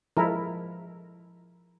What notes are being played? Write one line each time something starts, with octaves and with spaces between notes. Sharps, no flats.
F3 G#3 E4 A4 A#4